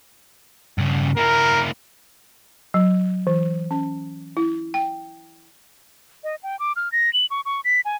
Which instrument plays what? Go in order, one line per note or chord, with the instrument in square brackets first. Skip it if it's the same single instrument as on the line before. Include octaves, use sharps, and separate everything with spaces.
[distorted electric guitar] G2 C#3
[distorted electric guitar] A#3 E4 [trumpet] A#4
[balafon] F#3
E3
C#4
E4
G5
[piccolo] D#5
G5
D6
F6
A#6
F#7
C#6
C#6
B6
G#5